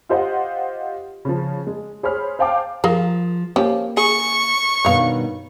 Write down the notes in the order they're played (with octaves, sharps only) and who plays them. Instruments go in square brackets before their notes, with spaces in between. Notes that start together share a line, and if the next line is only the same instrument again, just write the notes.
[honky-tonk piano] F4 G4 C5 D#5 F#5
C#3 F3
G#3
G#4 C5 C#5 B5 F6
C5 F5 G5 A5 D6
[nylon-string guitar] F3 [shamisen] G#4 A#4 F5
[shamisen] F3 C#4 G4 [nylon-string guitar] A#3
[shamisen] G#4 [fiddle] C#6
[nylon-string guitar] G2 B2 D#3 [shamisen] C#5 F5